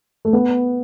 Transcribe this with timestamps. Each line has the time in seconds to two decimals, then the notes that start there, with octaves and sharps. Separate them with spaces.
0.25 A3
0.33 B3